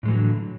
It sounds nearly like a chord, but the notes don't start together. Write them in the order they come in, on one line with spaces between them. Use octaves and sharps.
A2 G#3 E3 F#3 D3